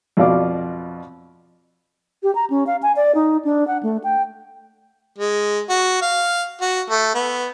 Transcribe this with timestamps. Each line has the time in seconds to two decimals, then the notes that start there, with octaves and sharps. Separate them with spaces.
0.17 F2 B2 F4 D5 F5 D6
2.23 G4
2.35 A#5
2.50 C#4
2.67 F5
2.83 G#5
2.96 D5
3.15 D#4
3.45 D4
3.67 F#5
3.83 A3
4.04 G5
5.18 G#3
5.69 F#4
6.02 F5
6.61 F#4
6.90 A3
7.14 B3